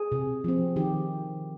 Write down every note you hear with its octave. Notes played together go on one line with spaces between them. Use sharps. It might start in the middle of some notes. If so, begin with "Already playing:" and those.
Already playing: G#4
C3
F3 C4
D#3 G4